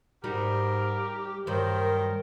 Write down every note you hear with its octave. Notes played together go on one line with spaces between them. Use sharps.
G#2 G3 D#4 F#4 G4 A#4
G2 D#3 F#3 A#4 C5